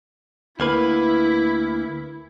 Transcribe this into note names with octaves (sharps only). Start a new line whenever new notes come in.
D2 A#3 E4 B4